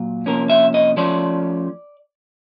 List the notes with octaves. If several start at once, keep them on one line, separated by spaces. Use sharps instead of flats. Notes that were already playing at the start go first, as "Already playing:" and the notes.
Already playing: A#2 F#3
C3 F3 A#3 C#4 A#4
E5
D#5
F3 A3 C#4 D5